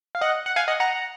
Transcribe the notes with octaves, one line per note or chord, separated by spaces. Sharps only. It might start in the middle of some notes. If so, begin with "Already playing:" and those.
F5
D#5 F#5
F#5
F5 G#5
D#5 F#5
F#5 A#5